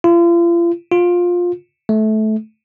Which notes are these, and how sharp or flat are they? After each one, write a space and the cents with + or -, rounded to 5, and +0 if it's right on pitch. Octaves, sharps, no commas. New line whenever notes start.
F4 -40
F4 +15
A3 -20